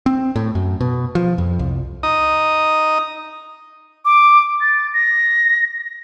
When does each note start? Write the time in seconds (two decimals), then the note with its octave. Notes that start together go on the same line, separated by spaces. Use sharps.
0.06 C4
0.36 A2
0.55 F#2
0.81 B2
1.15 F3
1.38 F2
1.59 C2
2.03 D#4 D#6
4.05 D6
4.61 A6
4.94 A#6